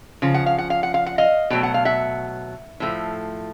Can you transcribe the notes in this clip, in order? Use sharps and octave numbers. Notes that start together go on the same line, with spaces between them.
C#3 F3
F#5
F5
F#5
F5
F#5
F5
F#5
D#5 F5
B2 F#3 A3 G5
F#5
F5
E5 F#5
A2 F3 A3